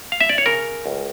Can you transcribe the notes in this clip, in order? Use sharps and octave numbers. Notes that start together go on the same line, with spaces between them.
F5
E5
D5
C#5
C#3 A#4
C#2